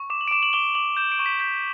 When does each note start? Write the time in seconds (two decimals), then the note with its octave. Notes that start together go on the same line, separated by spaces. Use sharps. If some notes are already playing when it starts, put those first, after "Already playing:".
Already playing: C#6
0.10 D6 E7
0.21 F#7
0.28 D7
0.31 D6 E7
0.43 F#7
0.53 D6 G7
0.75 D6 F#7
0.97 G6 E7
1.12 D7
1.19 C#6
1.26 B6
1.40 G6 B6